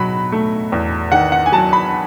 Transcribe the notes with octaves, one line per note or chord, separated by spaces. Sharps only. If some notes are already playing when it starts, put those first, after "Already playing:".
Already playing: B2 F#3 B5
A3
E2
D#3 F#5
F#5
G#5
F#3 A5
B5